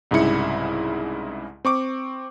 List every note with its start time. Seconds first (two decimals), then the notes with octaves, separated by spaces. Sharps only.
0.11 C2 G#2 C#3 E4 C#7
1.65 C4 C#6 D6